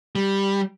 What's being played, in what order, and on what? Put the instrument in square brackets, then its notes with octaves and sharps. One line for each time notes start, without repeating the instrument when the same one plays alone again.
[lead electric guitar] G3